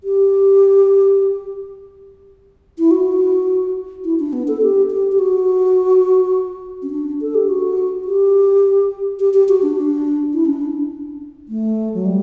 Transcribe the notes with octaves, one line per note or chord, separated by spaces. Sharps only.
G4
E4
F#4
E4
D4
B3
A4
G4
G4
G4
F#4
C#4
D4
A4
G4
F#4
G4
G4
G4
F#4
D4
D4
E4
C#4
D4
A3
F#3
G3